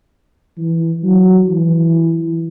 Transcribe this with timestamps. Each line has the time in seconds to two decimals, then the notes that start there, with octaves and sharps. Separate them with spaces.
0.58 E3
1.03 F#3
1.48 E3